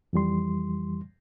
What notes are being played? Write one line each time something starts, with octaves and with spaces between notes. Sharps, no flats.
F2 E3 G3 C6